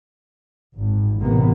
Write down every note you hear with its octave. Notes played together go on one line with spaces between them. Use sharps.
G#1
A1 C3 A#3 B3